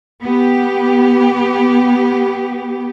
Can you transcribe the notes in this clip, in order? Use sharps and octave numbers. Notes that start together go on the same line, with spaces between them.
B3 G4